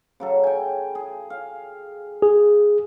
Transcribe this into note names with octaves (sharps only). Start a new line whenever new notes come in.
C#3 F#3 A4
G5 G#5
G#4
F5
G#4